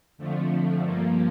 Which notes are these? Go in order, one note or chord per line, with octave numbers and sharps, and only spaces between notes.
F2 D3 F3 A3
G2 F3 A#3